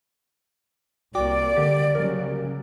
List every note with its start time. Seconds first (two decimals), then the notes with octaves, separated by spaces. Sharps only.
1.15 C2 A#3 F#4 D5 G5 D6
1.56 D3 G4
1.95 C#3 F#3 G3 A#4